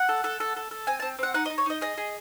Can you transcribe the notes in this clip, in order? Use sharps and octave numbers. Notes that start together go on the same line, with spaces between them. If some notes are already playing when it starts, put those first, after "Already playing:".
Already playing: F#5
A4
A4
A4
A4
A4
C4 G#5
C4 A5
C4 F#5
D#4 F#5
D#5
D#4
C#5
D#4 D#5
G#4 D#5
G#4